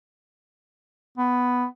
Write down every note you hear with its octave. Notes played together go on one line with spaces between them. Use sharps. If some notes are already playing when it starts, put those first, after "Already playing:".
B3